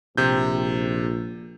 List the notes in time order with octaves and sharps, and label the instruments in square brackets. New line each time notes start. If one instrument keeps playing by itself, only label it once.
[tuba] A#1 [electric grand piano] C3 G6